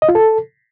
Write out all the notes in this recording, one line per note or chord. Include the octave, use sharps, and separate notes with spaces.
D#5
F4
A4